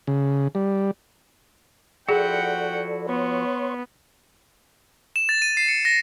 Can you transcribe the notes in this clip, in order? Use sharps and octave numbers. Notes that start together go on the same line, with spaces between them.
C#3
G3
F3 E4 F#4 G#4 A4 D5 F#5 G5
B3 C#5 C6 C#6
E7
A6
D#7
C7
C#7
A#6